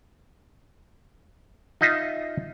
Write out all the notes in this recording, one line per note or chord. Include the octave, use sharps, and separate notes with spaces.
D#4 F4 D#5 E5